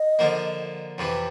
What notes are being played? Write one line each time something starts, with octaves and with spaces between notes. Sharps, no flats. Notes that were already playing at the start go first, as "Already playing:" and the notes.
Already playing: D#5
D3 F3 A#3
F2 C3 E3